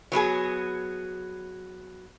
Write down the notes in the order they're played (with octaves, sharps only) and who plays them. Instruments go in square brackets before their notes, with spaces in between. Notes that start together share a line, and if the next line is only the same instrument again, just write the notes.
[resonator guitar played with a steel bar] F#3 B3 F#4 G#4